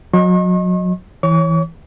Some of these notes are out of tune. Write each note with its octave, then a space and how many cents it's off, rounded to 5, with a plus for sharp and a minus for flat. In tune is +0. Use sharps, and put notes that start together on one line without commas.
F#3 -30 D#5 -5 C#6 -45
E3 -5 C#5 +0 C#6 +45